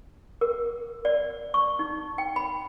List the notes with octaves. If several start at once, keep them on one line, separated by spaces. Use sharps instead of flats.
A#4
D5
C#6
D#4
G5
B5